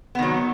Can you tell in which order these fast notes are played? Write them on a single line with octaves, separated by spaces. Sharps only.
B3 D#3 F#3